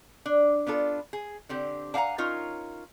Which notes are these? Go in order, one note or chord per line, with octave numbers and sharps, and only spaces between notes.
D4
B3 D4 F4 A4
G#4
D3 C4 G4
D4 F5 F#5 G#5 A#5
C#4 D#4 F4 A#4 C#5